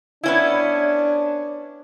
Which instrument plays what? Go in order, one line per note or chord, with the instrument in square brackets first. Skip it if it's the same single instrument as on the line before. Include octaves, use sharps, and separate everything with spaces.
[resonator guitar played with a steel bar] B3 C#4 E4 [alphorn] D4